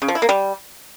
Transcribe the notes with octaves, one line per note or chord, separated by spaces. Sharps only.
C#3
F3
E4
A#3
G3